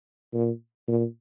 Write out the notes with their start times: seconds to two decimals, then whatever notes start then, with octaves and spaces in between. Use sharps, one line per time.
0.33 A#2
0.88 A#2